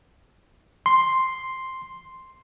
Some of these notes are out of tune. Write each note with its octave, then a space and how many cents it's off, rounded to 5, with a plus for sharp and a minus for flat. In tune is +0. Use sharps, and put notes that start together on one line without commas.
C6 +0